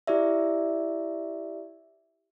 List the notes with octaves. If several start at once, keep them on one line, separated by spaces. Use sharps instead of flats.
E4 G4 D5 E5